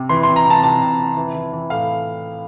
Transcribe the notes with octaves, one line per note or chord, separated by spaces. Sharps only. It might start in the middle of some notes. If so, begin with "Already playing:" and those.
Already playing: C3
E3 C6
C6
C3
A#5
C3
A5
C3 A5
C3
C3
E3
E3
E3
A2 F5